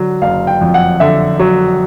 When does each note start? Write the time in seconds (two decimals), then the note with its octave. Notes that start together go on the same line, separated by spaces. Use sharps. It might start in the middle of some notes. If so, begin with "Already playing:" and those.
Already playing: D3 F#3
0.22 F#1 F5
0.47 G5
0.61 F2
0.74 F#5
1.00 D3 E5
1.39 F#3